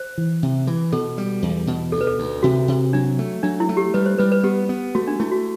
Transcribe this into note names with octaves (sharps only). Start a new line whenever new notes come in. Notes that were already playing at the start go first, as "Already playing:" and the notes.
Already playing: C5
E3
C3
E3
B2 A4
G3
E2
B2
D2 A4
B4
A4
D2
C3 F#4
C3
F#3 D4
A3
F#3 D4
E4
A3
G4
G3 B4
C5
G3 B4
B4
B3 G4
B3
A3 F#4
D4
A3 E4
F#4